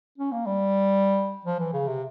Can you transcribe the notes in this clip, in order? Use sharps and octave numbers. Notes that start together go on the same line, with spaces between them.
C#4
A#3
G3
F3
E3
C#3
C3